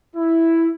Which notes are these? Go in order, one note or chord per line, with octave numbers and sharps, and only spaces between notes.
E4